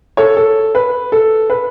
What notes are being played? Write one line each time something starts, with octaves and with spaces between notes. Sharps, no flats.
A4 C#5
A4
B4
A4
B4